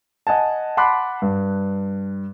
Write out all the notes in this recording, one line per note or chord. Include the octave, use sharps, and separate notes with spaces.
D#5 F#5 G#5 A5
F#5 A5 B5 C6 D6 F#6
G2